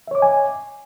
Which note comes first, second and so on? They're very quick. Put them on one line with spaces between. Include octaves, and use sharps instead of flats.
E5 C#5 D6 D#5 G#5